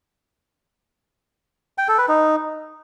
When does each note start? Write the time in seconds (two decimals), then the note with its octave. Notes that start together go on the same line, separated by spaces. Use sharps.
1.78 G5
1.88 A4
1.98 B4
2.08 D#4